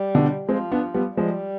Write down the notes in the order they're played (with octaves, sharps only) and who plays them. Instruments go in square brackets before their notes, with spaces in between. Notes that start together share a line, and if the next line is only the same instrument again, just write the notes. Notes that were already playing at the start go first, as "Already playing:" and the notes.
Already playing: [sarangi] G3
[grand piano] B2 D3
[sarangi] F3 [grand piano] G#3 C4
[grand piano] B3 D4
G3 B3
[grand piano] F3 G#3 [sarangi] G3